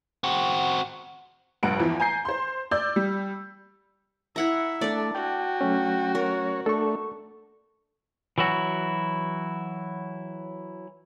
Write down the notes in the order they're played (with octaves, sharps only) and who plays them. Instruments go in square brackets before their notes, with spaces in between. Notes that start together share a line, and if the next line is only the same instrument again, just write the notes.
[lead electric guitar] C4 F#4
[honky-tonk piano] F1 A#1 G2 F#5 D7
E2 E3 F3
G#5 A#5 G6 C7
C5 C6
D5 E6 G6
G3
[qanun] E4 F#5 A#5 [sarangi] E5
[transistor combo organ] A3 [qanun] D4 D5
[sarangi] F#4 [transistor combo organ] G5
[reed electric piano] F#3 A3 C#4
[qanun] A#4 [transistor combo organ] C#5
[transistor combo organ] A3 D4 [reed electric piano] A4 C#6
[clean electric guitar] E3 F#3 E4 F#4